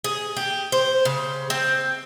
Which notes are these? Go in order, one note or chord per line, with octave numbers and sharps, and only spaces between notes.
G#4
G4
C5
C#3
C4